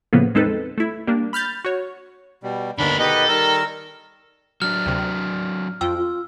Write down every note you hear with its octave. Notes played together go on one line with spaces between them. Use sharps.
A2 C#3 F3 A#3 B3
E2 G#3 C4 D#4 A4 B4
A3 E4
G3 A#3 D4
B5 F6 G6 A6
F#4 C#5
B2 G3
D#2 D3 D#3 B3 D4 B5
B2 D#3 G4 A4 B4 D#5
D#3 G3 A#4 E6
F#3 D4 F6
D2 C3
F2 F4 G5 E6
F4